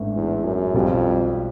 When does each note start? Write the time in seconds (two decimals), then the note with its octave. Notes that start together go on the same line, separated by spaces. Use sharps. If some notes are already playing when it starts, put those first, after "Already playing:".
Already playing: A1 G#2 E3 A3 D4
0.15 E2
0.45 F#2
0.74 B1 F2 B2 G3